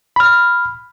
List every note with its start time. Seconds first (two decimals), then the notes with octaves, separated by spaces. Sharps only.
0.16 B5 F6